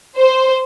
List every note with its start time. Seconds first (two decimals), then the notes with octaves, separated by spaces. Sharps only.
0.18 C5